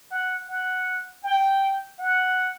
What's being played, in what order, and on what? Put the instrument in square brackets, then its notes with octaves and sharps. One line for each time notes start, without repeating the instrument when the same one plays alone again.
[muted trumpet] F#5
F#5
G5
F#5